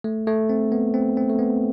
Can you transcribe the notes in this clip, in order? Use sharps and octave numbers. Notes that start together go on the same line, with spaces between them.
A3
A3
C4
B3
C4
C4
A3
B3